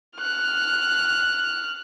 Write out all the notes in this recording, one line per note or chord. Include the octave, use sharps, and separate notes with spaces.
F6 F#6